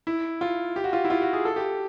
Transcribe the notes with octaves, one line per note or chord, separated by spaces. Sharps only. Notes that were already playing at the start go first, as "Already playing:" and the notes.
E4
F4
G4
F#4
F4
E4
F4
F#4
G#4
A4
G4